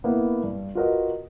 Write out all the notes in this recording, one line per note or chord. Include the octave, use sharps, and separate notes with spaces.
A#3 B3 E4
G2
F4 F#4 A#4 B4 D#5